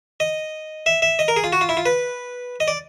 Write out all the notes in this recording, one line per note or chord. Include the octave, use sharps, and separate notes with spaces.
D#5
E5
E5
D#5
A#4
G#4
F4
F#4
F4
E4
F4
B4
D#5
D5